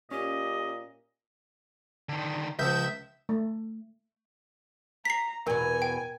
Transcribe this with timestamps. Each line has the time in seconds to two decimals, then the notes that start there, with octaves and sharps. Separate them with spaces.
0.11 A#2 C#4 G4 D#5
2.09 D3 D#3
2.59 C#2 F3 E5 G6
3.29 A3
5.05 A#5 B6 C7
5.47 E2 B2 A#4 G#5
5.82 G5